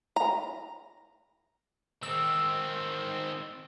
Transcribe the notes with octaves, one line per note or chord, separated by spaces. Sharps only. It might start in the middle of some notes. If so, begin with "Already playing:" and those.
A#5
D#3 C4 E6